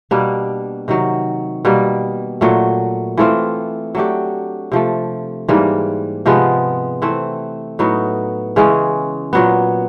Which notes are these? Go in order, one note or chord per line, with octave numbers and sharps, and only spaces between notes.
B2 G3 A#3 D4
C3 D#3 F#3
B2 G3 A#3
A#2 F#3 A3
E3 A3 C4 F4
F#3 A3 D4 G4
C3 F3 A3
G#2 E3 G3 A#3
C3 F3 G#3 B3
E3 A3 C4
A2 F#3 B3 D#4
C#3 E3 G#3 C#4
A#2 F#3 B3